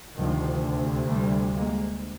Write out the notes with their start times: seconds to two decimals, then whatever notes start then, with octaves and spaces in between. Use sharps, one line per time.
0.16 D2 C3 D#3 F3
1.09 G3 A3
1.55 G#3 A#3